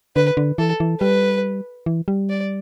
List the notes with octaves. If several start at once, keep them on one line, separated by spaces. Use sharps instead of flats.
D3 B4
D3
E3 A4
E3
G3 B4
E3
G3
D5